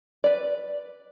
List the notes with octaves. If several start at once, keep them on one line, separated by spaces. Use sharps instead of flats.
B4 D5